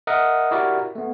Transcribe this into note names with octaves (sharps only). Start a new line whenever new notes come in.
A#4 D#5 E5 F#5 D#6
E4 F#4 G4 A#4 D5
A3 B3